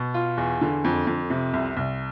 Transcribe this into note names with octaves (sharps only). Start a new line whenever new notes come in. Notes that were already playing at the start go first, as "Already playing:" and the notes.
Already playing: B2
F4
E2
D3
F2
F2
C3
C2
C2